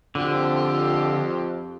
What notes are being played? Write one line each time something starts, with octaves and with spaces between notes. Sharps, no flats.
F2 D3 C4 F4 G4